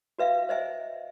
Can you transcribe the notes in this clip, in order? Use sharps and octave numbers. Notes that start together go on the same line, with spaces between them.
F#4 B4 E5 F5
C5 D#5 E5 G#5